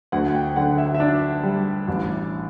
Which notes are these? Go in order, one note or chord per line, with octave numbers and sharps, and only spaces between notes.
D2 F#5
G5
D3 F#5
E5
F#5
E5
D4
G3
A1